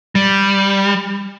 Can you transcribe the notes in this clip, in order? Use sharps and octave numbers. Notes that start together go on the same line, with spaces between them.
G3